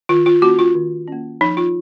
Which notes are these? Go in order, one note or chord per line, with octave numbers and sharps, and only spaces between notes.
D#3 F4
F4
A#3 C#4 F#4
F4
D#3
A#3 C#4
F3 D#4
F4